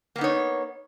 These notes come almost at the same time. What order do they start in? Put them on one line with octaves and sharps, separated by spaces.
A#3 B3 D#4 C#5